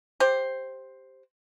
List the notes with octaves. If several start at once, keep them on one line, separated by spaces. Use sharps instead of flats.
G4 C5